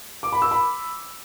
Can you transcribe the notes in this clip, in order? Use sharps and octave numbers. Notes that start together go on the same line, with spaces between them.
D6
B5
E6
B5